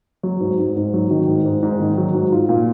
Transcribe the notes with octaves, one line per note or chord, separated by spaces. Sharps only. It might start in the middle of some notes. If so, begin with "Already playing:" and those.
F#3
G#2
G#2
G#2
F#3
D#3
G#2
G#2
G#2
D#3
F#3
G#2
F4
A#2